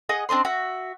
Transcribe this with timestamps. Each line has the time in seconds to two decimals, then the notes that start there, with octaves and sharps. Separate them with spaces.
0.09 G#4 D#5 F#5 D#6
0.29 C4 D4 D#5 C6
0.45 F#4 E5